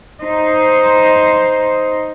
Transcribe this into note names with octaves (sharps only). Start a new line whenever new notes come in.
D#4 C5